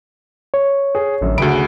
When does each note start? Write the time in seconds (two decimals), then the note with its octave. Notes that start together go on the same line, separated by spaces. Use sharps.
0.54 C#5
0.95 G#4
1.21 A1 F#2 D3
1.38 D2 C#3 F#4 G#4 B5 D7